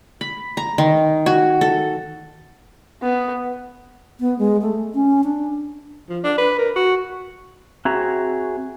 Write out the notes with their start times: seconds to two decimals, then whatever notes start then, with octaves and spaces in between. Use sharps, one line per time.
0.21 B5
0.57 A#5
0.78 D#3
1.26 F#4
1.61 A4
3.02 B3
4.20 B3
4.39 G#3
4.61 A3
4.94 C#4
5.24 D4
6.09 F3
6.24 D4
6.38 B4
6.58 A#4
6.76 F#4
7.85 C4 F#4 G#4 E5 A#5